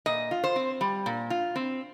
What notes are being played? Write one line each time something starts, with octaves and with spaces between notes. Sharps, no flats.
A#2 D#5
F4
C5
C4
G3
A#2
F4
C4